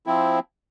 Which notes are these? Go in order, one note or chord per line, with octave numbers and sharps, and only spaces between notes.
F3 C4 E4